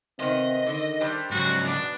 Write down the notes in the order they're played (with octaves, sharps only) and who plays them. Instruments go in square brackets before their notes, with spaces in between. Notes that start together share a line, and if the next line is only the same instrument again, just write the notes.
[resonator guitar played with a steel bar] C3 D#3 B3 [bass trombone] C4 [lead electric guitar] D#5
[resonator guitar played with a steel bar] D3 [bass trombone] D#3
[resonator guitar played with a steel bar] G3 G4 C5 [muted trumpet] D4
[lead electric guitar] G#2 C#3 [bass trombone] F#3 [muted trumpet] F#4
[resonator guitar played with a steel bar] B3 D5 [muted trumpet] D4